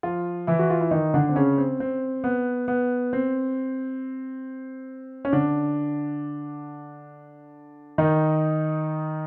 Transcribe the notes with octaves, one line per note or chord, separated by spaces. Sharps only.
F3 F4
E3 E4
F#4
F4
E4
D#3 D#4
D3 D4
C4
C#3 C#4
C4
C4
B3
B3
C4
C#4
D3 D4
D#3 D#4